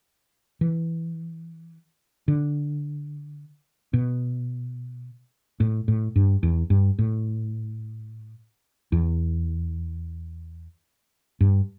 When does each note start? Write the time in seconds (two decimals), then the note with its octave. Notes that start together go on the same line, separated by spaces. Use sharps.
0.61 E3
2.28 D3
3.93 B2
5.60 A2
5.88 A2
6.16 G2
6.43 E2
6.70 G2
6.99 A2
8.92 E2
11.41 G2